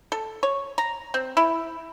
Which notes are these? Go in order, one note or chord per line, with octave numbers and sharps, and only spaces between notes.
A4
C#5
A#5
C4
E4